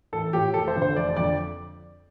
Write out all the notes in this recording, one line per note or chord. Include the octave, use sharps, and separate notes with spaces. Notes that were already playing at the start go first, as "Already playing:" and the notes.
A1 A4
A2 F3 G4
F1 A4
C5
F2 D3
C5
F1 D5
F2 D3 D5